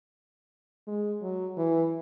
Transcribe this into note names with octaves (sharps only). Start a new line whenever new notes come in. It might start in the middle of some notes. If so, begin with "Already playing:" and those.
G#3
F#3
E3